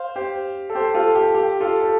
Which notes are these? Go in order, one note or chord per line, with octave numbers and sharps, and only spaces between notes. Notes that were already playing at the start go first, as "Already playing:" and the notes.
Already playing: C5 F5
G4 C5
A4
G4 C5
F4 A4
G4
G4
F4 A4
A4